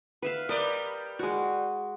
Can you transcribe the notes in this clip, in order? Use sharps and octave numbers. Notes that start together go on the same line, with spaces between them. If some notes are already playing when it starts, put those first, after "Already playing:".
B4 E5 F5
G3 A#4 B4 D5 D#5
G#3 F#4